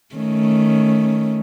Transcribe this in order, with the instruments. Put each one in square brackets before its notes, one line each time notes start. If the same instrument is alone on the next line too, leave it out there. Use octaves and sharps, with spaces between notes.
[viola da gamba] D#3 A3 C#4